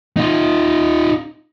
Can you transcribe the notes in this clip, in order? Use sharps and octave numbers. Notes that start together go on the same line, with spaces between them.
D#4 F4